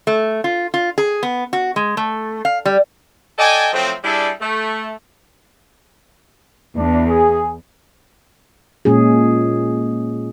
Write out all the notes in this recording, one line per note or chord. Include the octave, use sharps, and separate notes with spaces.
A3
F4
F4
G#4
B3
F#4
G#3
A3
F5
G3
A4 D5 D#5 G5 G#5
F3 F#3 A3 C4
G3 D4 E4 G#4 A4
A3
E2 D4
G#4
A#2 G#3 C#4 G#4